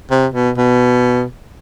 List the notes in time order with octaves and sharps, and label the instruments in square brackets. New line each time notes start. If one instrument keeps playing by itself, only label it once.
[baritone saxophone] C3
B2
B2